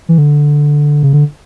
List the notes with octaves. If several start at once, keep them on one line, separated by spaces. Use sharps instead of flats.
E3
D3
C#3
D3